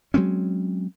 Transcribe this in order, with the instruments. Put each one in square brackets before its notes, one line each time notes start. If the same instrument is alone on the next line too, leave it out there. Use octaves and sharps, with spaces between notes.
[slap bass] F#3 G#3 C4 C#4